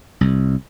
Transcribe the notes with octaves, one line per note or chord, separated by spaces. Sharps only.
C2